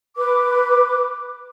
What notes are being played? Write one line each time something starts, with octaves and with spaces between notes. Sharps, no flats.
B4 D6